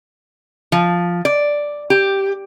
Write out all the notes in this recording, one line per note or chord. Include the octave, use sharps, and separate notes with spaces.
F3
D5
G4